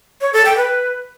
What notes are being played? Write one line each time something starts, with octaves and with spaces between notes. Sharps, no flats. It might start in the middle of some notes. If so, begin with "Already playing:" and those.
C#5
A4
G5
B4